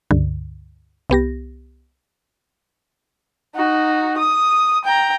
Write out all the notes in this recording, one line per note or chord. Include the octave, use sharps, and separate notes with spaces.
C#2 G2 D3
C2 B3 G4 A#6
D#4 F#4
D#6
G5 A#5